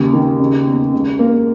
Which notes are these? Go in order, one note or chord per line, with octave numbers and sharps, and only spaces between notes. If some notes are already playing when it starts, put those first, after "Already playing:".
Already playing: D#2 C#3
D#3
C#3
E2
C#2
A#3